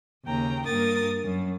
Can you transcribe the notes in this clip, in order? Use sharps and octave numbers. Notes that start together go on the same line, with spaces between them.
D#2 C#3 G5 A#5
G2 A#3 A#4 D#6 A6
F#2